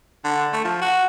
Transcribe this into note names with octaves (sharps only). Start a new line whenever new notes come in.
D3
A3
F3
F#4